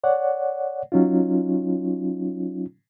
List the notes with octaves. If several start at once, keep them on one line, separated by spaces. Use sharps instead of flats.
C#5 D5 F#5
F#3 C#4 D#4 F4